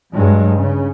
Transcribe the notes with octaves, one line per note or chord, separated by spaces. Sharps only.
G2 F#3 G#3
C#3